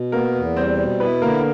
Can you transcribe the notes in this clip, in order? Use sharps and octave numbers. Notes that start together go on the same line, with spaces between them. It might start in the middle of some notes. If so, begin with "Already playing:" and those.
Already playing: B2
A#3 B3 A#4
E2
G3 C4 C5
B2
B3 E4 B4
D3 A#3 A#4